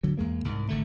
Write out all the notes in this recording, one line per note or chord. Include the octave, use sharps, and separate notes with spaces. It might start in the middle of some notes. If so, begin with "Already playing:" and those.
D3 F#3
E2 G#3 A#3
C2 G#2
G#1 D3 A3